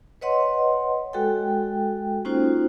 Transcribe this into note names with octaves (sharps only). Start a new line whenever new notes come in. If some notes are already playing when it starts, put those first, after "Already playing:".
B4 C#5 D#5 F#5 C6
G#3 F#4 A4 G5
A#3 C#4 D#4 F4 F#4 C5